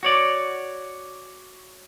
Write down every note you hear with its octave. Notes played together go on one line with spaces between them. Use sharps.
F#4 C#5 D5